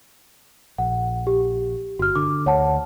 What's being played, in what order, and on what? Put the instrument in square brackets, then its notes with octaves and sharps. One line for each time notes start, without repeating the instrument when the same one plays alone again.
[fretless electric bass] A#1 [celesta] F#5
[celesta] G4
[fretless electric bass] G1 [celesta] F#4 F6
[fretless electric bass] D3 [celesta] D6
[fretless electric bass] D2 [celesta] C#5 F#5 A5